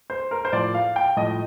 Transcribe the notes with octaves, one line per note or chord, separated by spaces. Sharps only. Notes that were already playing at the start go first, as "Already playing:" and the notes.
C5
A#4
C5
A2 F3 D5
F5
G5
A2 F3 D#5